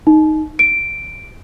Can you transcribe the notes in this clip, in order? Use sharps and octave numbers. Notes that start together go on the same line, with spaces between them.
D#4
D7